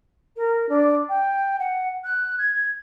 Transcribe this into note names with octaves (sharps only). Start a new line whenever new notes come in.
A#4
D4
G5
F#5
F#6
G#6